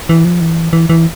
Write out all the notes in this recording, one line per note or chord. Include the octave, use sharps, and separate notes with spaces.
E3
F3
E3
E3
E3